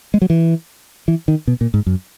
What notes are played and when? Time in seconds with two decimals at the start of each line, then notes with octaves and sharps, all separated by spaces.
0.14 G#3
0.22 F#3
0.30 E3
1.08 E3
1.28 D#3
1.48 B2
1.61 A#2
1.74 G#2
1.87 F#2